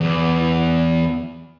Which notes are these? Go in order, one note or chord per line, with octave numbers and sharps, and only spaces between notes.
E2